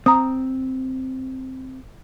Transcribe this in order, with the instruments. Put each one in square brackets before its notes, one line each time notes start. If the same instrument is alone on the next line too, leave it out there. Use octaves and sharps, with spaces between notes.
[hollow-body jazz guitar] C4 [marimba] A#5 D#6